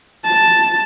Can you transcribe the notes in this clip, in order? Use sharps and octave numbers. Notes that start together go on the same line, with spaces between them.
A5